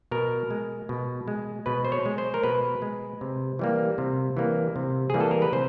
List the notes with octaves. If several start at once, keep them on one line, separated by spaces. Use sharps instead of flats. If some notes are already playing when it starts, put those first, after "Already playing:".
B2 A#4
G#3
B2
G#3
B2 B4
C5
C#5
G#3
C5
A#4
B2 B4
G#3
C3
E3 G3 A#3
C3
E3 G3 A#3
C3
E3 G3 A#3 G#4
A4
A#4
B4
C3 C5